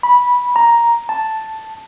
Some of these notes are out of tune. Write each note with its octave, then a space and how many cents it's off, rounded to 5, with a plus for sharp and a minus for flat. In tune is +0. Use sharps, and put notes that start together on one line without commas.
B5 -15
A#5 +5
A5 +0